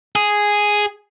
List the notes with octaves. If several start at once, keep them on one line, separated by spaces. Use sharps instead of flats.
G#4